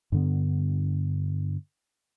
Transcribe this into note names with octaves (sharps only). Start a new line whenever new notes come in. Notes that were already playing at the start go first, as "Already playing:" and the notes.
G2 D3 B3